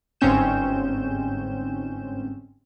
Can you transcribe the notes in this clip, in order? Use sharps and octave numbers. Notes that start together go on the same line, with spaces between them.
G1 G#2 C4 C#4 G6 E7